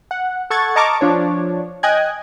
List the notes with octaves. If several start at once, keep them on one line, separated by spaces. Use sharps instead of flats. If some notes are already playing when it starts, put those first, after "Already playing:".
F#5
A4 F#5 C#6 G#6 A6
D#5 A5 A#5 C#6 D6 F6
F3 D4 C#5
D#5 G5 G#5 F#6 G#6